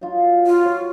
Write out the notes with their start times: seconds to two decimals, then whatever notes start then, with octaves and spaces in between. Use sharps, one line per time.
0.01 F#3 D#4 F4
0.47 F4
0.65 C#5